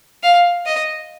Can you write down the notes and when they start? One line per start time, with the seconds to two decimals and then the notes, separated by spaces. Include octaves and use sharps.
0.23 F5
0.66 D#5